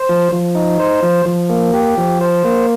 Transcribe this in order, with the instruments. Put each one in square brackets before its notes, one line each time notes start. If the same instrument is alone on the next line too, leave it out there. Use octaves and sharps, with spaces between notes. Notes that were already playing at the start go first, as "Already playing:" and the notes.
Already playing: [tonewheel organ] C5
F3
F3
D#4
C5
F3
F3
A#3
G4
F3
C5
A#3